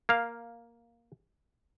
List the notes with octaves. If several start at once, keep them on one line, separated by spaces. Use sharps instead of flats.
A#3 F5